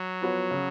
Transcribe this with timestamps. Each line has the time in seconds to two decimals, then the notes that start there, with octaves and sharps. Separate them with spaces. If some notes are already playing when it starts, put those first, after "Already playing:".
Already playing: F#3
0.22 F3 B3 F#4 C#5
0.51 C#3